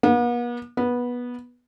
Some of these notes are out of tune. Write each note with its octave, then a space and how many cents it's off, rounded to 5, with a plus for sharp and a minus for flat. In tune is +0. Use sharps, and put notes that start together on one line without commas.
B3 -45
B3 -15